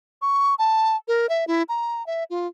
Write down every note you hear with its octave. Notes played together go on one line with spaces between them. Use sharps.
C#6
A5
A#4
E5
E4
A#5
E5
F4